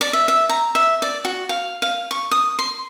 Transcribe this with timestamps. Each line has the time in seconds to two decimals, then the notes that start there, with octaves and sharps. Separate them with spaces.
0.01 D5
0.13 E5
0.28 E5
0.49 A#5
0.75 E5
1.02 D5
1.25 F#4
1.49 F5
1.82 F5
2.11 C#6
2.31 D#6
2.59 C6